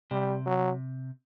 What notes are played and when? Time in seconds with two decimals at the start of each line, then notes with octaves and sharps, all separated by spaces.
0.11 C3 G3
0.46 F#3